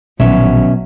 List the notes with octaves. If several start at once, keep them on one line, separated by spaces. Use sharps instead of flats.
A#1 B2 D#3 F#3 C#4 E5